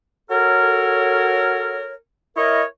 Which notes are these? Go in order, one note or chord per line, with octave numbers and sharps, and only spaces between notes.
F#4 A4 A#4 C#5
E4 A#4 C#5 D#5